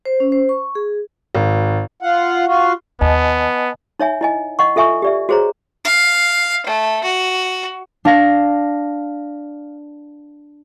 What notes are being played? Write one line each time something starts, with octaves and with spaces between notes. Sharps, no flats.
C5
C#4
C5
C#6
G#4
G#1
F4 F#5
F4 F#4
D#2 B3 D#5 G#5 A5
D#4 C#5 E5 G#5
E4 D#5 G#5
D#5 F#5 C#6
F4 A4 E5 G#5 C#6
G4 D5 E5
F#4 G#4 C5 C#5 A#5
F5
A3
F#4
D4 F5 A#6